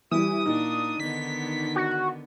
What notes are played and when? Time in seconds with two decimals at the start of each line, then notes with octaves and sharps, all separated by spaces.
0.11 E3 G3 E4 D#6
0.46 A#2 D4 D#4
1.00 D3 D#3 B3 B6
1.76 F#4